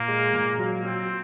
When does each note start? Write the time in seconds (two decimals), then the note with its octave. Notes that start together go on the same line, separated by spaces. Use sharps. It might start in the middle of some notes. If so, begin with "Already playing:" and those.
Already playing: A#2 A#3
0.08 G#3
0.33 A#2
0.59 F#3
0.85 F#3 C4